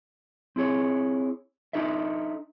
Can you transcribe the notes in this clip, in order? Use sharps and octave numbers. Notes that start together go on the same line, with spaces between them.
C4 E4 G#4 C#5
D4 D#4 A4 D#5 E5